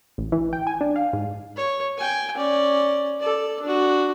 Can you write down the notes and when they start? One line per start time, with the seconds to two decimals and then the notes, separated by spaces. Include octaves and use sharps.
0.18 A1
0.32 E3
0.53 G5
0.67 G#5
0.81 D4
0.96 F5
1.13 G#2
1.56 C#5
1.98 G5 G#5
2.37 C#4 D5
3.20 A4 D5
3.62 D4 F#4